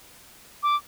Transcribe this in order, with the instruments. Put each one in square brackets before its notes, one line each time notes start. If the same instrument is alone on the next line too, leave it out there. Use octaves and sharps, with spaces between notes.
[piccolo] D6